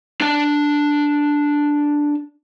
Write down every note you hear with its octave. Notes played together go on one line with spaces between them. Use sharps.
D4 A5